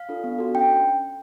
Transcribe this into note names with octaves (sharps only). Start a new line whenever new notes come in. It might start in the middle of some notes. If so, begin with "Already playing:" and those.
Already playing: F5
D4 F4 A4
B3
D4 F#4 A4
C#4 G5